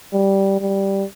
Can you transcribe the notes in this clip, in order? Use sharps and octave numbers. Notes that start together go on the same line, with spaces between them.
G3
G3